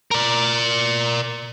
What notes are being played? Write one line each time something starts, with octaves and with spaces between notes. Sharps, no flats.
A#4 D5